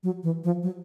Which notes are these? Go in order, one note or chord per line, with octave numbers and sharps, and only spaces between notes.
F#3
E3
F3
F#3